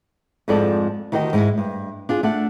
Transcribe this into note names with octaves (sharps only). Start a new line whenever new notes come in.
F2 G#2 F3 G#3 A4 D5
D2 D#3 F#4 G4 D5 D#5
G#2 G#3 E4
G2
D4 F4 G#4
A3 D4 F#5